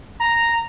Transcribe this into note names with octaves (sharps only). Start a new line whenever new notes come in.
A#5